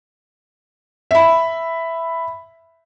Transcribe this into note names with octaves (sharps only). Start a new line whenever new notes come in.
E5 B5